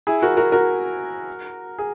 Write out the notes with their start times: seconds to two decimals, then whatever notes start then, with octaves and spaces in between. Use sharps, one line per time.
0.07 E4 G#4
0.22 F#4 A#4
0.37 F#4 A#4
0.52 F#4 A#4
1.79 G#4